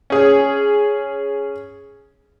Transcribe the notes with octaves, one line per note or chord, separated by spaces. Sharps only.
C#4 G#4